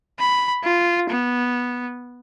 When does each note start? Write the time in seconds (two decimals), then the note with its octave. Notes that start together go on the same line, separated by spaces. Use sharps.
0.19 B5
0.64 F4
1.10 B3